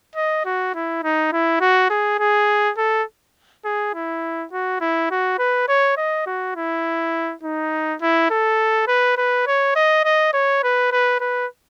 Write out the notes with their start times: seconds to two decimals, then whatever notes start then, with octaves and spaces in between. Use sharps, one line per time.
0.16 D#5
0.45 F#4
0.75 E4
1.04 D#4
1.32 E4
1.61 F#4
1.90 G#4
2.19 G#4
2.77 A4
3.65 G#4
3.94 E4
4.52 F#4
4.81 E4
5.11 F#4
5.39 B4
5.68 C#5
5.97 D#5
6.26 F#4
6.56 E4
7.43 D#4
8.01 E4
8.31 A4
8.88 B4
9.17 B4
9.47 C#5
9.76 D#5
10.05 D#5
10.33 C#5
10.63 B4
10.92 B4
11.20 B4